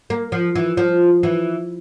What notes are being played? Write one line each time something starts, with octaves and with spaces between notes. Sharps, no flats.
A#3
F3
E3
F3
E3